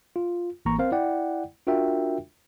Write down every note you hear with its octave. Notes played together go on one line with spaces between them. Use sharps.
F4
A1 E3 A#3 A#5 C#6
C4 A#4 C5 F5
E4 D5 F#5 G5
D4 F4 F#4 A#4 E5 G5